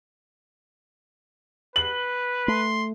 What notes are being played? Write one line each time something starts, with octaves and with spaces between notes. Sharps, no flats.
B4 F#7
A3 C6